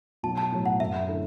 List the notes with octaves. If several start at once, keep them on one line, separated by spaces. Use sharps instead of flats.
B1 A5
A5
A2 F#3
F#5
F#2 E5
D3 A3 E4 A4